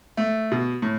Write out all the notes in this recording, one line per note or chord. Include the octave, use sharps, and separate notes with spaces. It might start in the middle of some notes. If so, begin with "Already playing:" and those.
A3
B2
A2